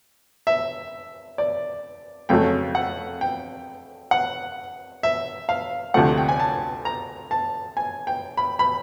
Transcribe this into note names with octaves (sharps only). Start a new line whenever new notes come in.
E5
D5
F2 C#3 F#3 A3 G5
F#5
G5
F#5
E5
F5
D2 C3 F3 A3 F#5
G5
G#5
A5
A#5
A5
G#5
G5
B5
B5